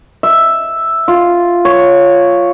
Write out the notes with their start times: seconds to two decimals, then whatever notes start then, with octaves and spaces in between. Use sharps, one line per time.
0.23 E5
1.08 F4
1.65 C#5